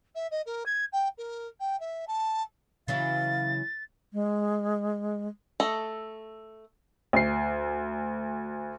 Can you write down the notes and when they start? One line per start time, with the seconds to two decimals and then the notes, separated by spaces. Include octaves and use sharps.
0.15 E5
0.31 D#5
0.46 A#4
0.66 G#6
0.93 G5
1.18 A#4
1.60 G5
1.80 E5
2.08 A5
2.88 C#3 E3 F#3 E4 F5 A6
4.13 G#3
5.60 A3 A4 D#5
7.13 D2 C7